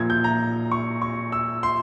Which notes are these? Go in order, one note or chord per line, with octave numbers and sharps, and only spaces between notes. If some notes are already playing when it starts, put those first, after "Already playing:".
Already playing: A#2 F3 G#6
G6
A#5
C#6
C#6
E6
C6